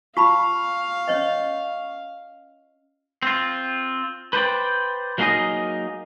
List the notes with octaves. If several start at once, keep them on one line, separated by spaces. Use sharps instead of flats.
F4 F5 A5 B5 C#6
C#4 C#5 D#5
C4 F4
B4 C5 D5 G5
F#3 A#3 D#4 G#4 A#4 D#5